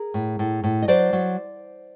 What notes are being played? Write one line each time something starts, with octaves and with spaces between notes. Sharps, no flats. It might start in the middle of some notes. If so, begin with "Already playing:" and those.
Already playing: G#4 A#4
A2
A2
A2
D#5
F#3 C5 D5
F#3